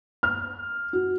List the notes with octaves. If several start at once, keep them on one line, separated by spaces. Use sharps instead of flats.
F6
F#4